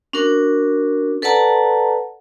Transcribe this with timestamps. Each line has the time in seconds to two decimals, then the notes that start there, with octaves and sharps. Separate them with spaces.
0.13 C#4 D4 F#4 A#4
1.22 A4 B4 D5 F#5 A5 A#5